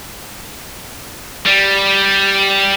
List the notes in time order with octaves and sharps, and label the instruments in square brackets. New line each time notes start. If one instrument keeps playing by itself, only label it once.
[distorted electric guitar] G3